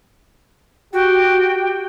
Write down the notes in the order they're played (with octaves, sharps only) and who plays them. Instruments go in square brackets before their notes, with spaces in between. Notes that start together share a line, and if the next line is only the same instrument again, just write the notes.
[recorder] F#4 [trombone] G4 [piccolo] G5